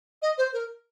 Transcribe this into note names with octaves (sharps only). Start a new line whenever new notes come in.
D#5
C5
A#4